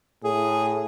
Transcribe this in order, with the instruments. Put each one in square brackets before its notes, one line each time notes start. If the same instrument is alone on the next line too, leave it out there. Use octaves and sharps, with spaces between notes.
[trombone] A2 [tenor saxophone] G#4